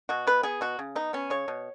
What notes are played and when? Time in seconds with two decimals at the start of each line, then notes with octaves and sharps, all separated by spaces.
0.09 B2 F#4
0.27 B3 B4
0.43 B3 G#4
0.61 B2 F#4
0.79 C#3
0.95 B3 D#4
1.13 B3 C#4
1.30 C#3 C#5
1.48 B2